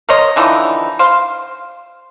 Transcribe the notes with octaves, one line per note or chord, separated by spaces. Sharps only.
A#4 C5 C#5 D#5
D3 E3 F3 D#4
C5 F5